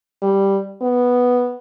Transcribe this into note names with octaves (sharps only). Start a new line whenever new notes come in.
G3
B3